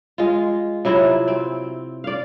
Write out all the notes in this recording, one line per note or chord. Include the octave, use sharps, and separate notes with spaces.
G#3 F4
C3 F#3 E4 F4
C4
D5 F5